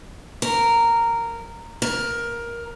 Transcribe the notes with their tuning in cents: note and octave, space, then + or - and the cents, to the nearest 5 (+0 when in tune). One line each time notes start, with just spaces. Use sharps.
A#4 -10
A#4 +15